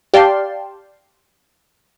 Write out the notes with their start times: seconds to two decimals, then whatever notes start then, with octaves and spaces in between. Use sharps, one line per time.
0.14 G4 D5 F5 G5 A5 C6